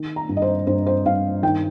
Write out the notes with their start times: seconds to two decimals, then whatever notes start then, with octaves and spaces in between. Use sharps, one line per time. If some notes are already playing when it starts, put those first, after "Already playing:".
Already playing: D#3
0.16 A#5
0.29 G2
0.37 D#5
0.42 C5
0.67 G2 C5
0.87 C5
1.05 G2 F5
1.43 D#3 G5